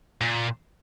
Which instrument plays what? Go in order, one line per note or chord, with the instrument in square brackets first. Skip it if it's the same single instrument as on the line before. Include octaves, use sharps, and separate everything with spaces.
[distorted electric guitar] A#2